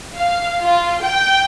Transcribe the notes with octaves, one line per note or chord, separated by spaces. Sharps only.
F5
F4
G5